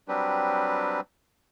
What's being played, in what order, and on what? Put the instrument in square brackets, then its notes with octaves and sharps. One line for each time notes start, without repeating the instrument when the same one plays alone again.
[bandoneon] F#3 G3 C4 D4 G4 B4